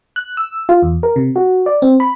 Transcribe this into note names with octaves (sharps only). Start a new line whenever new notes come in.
F#6
E6
F4
E2
A#4
C3
F#4
D5
C4
B5